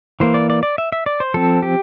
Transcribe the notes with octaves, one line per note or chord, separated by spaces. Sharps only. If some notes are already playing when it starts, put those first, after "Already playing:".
E3 A#3 C5
D5
D5
D5
E5
E5
D5
C5
F3 C4 A4
G4